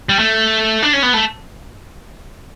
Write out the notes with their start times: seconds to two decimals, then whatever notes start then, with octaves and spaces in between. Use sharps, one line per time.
0.09 G3
0.19 A3
0.83 D4
0.93 C#4
1.03 B3
1.14 A3